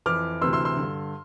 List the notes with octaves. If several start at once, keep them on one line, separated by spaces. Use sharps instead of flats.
F2 E3 D6 F6
D2 C3 E3 C6 E6
C6 E6
C6 E6
G2 D3